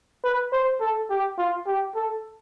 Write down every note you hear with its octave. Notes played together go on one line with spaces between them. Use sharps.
B4
C5
A4
G4
F4
G4
A4